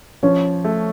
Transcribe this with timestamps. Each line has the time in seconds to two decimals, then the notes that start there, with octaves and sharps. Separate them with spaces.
0.23 F3 C#4
0.65 A3